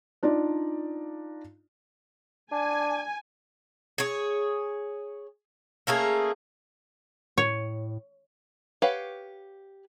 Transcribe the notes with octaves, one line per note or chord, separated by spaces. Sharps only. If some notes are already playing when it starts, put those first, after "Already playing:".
D4 D#4 F4 D5
D4 G#5
G#4 C#5
A3 A#3 C#4 G#4
A2 C#5
G4 B4 C#5 F5 F#5